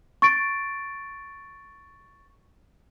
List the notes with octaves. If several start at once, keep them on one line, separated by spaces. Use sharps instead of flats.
C#6 A6 D7